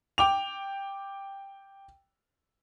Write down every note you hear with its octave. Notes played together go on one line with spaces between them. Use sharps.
G5 D6 F7